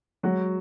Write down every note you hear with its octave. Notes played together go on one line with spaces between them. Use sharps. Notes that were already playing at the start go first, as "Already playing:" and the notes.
F#3 G#3 F#4